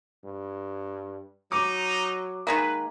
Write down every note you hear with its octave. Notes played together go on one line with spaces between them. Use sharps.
G2
F#3 D#4 D6
D#3 G#3 A#3 B4